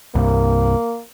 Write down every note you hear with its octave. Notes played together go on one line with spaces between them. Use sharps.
C2 G2 A#3